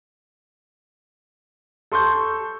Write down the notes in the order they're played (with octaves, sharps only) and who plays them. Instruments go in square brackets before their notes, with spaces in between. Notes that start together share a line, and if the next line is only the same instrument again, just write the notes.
[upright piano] A4 C6 C#6 G6